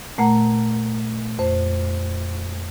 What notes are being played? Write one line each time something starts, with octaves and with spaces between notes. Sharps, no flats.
A#2 A3 F#5 A#5
F2 C5